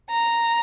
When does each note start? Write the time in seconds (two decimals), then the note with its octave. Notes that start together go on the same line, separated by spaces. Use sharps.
0.10 A#5